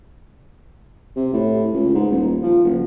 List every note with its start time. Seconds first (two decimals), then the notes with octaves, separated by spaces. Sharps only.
1.16 C3
1.33 A2
1.73 C#2
1.95 G#2
2.10 D#1
2.43 F3
2.64 F#1